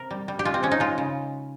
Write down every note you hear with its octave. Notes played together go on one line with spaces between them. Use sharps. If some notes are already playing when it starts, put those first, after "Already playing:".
Already playing: C3 A#4
G3
G3
G4
G#3 F4
C4
G#3 C#4
D#4
G#3 F4
C#3